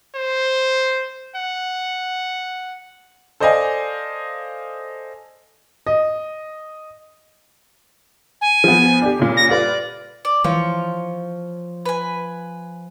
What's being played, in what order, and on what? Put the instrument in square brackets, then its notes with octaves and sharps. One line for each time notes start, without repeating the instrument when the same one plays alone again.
[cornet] C5
F#5
[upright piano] A4 C5 D5 D#5 F5 G#5
[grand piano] D#5
[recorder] G#5
[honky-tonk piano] F3 B3
D4 G4
G2 A#2 C#3
[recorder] A#6
[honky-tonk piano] F4 G4 B4 [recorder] D5
[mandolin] D5
[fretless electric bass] E3 [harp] F3 [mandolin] C#5
[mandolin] B4 G#5